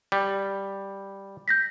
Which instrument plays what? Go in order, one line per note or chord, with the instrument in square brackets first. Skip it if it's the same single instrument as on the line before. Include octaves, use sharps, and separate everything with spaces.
[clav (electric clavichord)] G3
[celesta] G6 A#6 B6